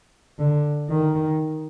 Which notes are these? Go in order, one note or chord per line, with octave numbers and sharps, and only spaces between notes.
D3
D#3